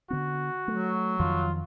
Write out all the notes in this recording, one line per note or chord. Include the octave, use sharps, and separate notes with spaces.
D3 B3 F#4
F#3 A3
F2 D#3 F3 F4